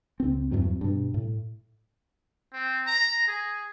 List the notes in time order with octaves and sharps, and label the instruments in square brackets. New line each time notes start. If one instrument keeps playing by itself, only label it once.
[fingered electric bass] C#2 C4
E2 G2 F#3 C4
G2 B2
A2
[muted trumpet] C4
A#5
G#4